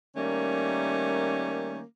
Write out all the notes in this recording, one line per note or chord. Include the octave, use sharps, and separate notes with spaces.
D#3 G3 A3 A#3 C#4